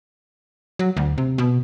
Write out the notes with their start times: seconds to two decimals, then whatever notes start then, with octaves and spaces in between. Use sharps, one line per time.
0.79 F#3
0.97 D2
1.18 C3
1.38 B2